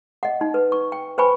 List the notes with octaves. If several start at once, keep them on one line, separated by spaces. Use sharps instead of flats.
D#5 F#5
D#4
B4
C#6
G5
B4 C5 G5 G#5 B5 C#6